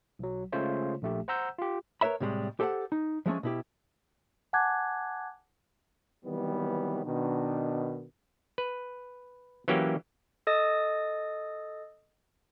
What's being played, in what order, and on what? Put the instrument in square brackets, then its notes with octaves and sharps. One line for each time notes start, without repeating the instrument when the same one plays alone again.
[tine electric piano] B1 F#3
C#3 G#3 A3 F4 C5 C#5
A#1 A3 G4
C5 F#5 A#5 E6 G6
F4 G4
[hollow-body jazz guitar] A#4 B4 C#5 E5 B5
A2 C3 E3 G3 G#3
G4 A4 C5 F5 F#5
D#4
F3 G#3 A3 C#4
B2 E4 G4
[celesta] F#5 G#5 A5 D6 F#6 G#6
[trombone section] C3 D#3 E3 F#3 G3 B3
B2 D#3 D4
[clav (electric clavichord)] B4
E3 F#3 A#3 C#4 G4
[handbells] A4 D#5 D#6 A6